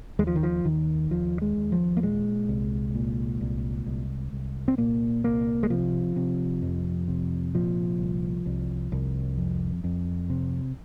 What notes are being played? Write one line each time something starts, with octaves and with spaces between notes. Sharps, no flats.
D#2 G#3
F3
D#3
F3
D#2 D#3
D#2 F3
G#3
D#2
F3
A#3
A#2 G#3
C2
A#2
C2
C2
C2
C4
A#2 A#3
C2 A#3
G#3
C3 F3
C3
F2
C3
A#2 F3
C2
C2
C2
F2
F2
C3